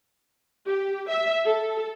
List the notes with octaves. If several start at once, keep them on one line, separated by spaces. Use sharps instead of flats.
G4
E5
A4